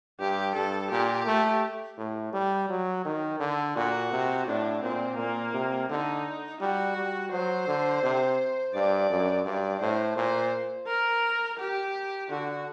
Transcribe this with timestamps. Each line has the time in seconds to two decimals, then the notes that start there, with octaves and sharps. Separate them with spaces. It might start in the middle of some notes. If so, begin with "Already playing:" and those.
0.20 G2 G4
0.55 G2 A4
0.91 A#2 G4
1.27 A3
1.98 A2
2.33 G3
2.70 F#3
3.05 D#3
3.40 D3
3.76 A#2 F#4
4.12 C3
4.47 A2 D4
4.83 A#2 C4
5.18 A#2 A#3
5.54 C3
5.90 D3 D#4
6.61 G3 F#4
6.97 G3
7.32 F#3 C5
7.68 D3
8.03 C3
8.74 G2 D5
9.10 F#2
9.45 G2 D5
9.81 A2 C5
10.17 A#2 C5
10.88 A#4
11.59 G4
12.30 D3 F#4